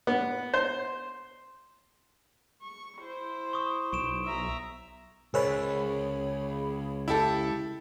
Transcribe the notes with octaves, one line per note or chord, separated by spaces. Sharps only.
B3
C5
C#6
E4 C5
C#6 D#6
B1 C#6 D7 E7
E5 A#5
C#2 G#4 A#4 C5 C#5 D#5 B5
E4 G4 A4